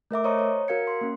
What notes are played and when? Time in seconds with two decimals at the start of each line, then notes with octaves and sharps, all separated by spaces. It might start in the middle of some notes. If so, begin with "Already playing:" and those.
0.11 A3 A#4 E5 D6
0.24 C5 C#5 D#5 A#5 C#6 D#6
0.39 C#5
0.68 F#4 A#4 F5 G#6 C#7
0.87 C6
1.01 A#3 C#4